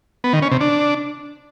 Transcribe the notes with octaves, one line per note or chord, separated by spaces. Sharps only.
B3
D#3
C#4
C3
D4